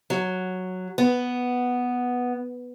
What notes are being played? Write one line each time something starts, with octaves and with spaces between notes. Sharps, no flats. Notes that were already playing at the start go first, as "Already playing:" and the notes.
F#3
B3